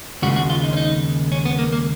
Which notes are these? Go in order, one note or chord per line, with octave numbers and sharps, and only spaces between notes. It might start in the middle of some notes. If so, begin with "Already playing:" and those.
D#2 C#3 G#3 F#4
F#4
F4
D#4
C#4
D#4
C#4
B3
A#3
A#3